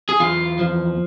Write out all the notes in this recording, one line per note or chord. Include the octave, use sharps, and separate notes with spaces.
G#4
E2 F4
F3